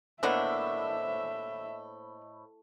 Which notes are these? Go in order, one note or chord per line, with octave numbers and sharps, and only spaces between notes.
A2 A#3 B3 D4 C5 D#5 E5 B5